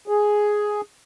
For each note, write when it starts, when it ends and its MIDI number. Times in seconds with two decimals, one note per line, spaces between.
0.08 0.81 68